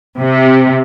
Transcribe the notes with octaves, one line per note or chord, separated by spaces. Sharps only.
C3